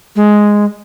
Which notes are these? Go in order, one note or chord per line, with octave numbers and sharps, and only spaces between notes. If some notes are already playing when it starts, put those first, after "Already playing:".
G#3